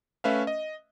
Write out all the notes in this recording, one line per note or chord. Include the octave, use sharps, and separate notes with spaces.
A3 C#4 B4 E5 F5
D#5